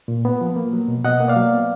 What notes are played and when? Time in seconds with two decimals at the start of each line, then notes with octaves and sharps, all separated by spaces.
0.08 A#2
0.25 B3
0.41 F3
0.56 A#3
0.73 F#3
0.88 B2
1.04 B2 D#5 F#5
1.20 A#3
1.28 D5 F5
1.36 F#3
1.54 B3